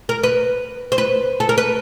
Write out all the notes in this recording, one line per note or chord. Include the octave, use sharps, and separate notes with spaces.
A#4
B4
C5
B4
A4
A#4
B4